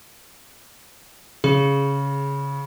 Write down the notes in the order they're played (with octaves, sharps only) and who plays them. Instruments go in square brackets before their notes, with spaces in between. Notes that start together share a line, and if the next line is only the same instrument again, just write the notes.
[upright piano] C#3 [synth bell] G#4